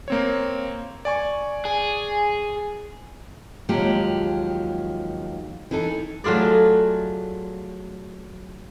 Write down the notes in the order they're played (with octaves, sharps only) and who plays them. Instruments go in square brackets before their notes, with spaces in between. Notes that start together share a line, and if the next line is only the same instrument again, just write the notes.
[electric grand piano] A#3 C4 C#5
D5 G#5 C#6
[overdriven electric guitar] G#4
[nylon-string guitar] D#2 F3 F#3 G#3 G4
E3 D#4 A4
[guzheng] F#3 A3 F4 G#4 D5